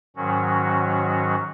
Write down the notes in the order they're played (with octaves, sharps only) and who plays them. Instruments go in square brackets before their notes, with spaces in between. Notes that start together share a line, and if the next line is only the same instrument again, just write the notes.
[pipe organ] G#2 D#3 F#3 C#4 F#4